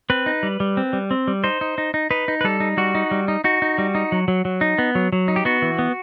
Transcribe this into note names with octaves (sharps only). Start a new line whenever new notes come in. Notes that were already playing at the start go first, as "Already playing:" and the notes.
C4 B4
D#4
G3
G3
C4
G3
C4
G3
D#4 C5
D#4
D#4
D#4
D#4 B4
D#4
B4
G3 A4
D#4
G3 F#4
D#4
G3
D#4
D#4 F#4
D#4
G3
D#4
F#3
F#3
F#3
D#4
B3
F#3
F#3
D#4
G4
B3 F#4
E3
B3